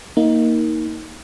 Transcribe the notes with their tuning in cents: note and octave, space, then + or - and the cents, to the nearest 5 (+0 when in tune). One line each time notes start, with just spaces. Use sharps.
A#3 +0 D#4 +20